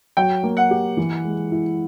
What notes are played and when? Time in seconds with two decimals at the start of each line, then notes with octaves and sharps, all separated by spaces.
0.17 F#3 G5
0.43 A#3
0.57 F#5
0.71 G4
0.97 E3
1.24 G#3
1.52 E4